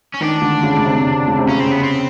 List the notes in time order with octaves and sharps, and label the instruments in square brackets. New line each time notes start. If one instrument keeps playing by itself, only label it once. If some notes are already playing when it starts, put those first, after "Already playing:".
[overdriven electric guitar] C#4
[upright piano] D#3 [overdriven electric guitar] D4
[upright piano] D3
C#3
C#3
C3
C#3
C3
[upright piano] C#3 [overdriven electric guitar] C#4
[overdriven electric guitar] C4
B3
C4